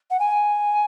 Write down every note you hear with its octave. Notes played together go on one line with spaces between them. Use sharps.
F#5
G#5